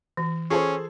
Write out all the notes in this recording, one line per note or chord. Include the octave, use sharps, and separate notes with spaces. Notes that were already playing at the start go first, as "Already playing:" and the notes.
E3
C#4 F4 G#4 A4 C5